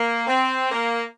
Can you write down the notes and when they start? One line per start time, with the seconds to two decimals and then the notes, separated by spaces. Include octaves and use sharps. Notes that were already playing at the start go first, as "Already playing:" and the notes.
Already playing: A#3
0.27 C4
0.71 A#3